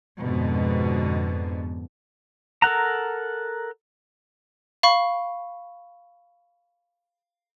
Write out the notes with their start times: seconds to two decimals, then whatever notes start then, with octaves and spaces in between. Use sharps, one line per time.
0.21 F2 G#2 B2 D3
2.62 A4 A#4 F#5 A#5
4.83 F5 B5 C#6